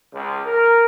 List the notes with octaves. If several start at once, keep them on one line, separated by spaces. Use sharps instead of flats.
C#2
A#4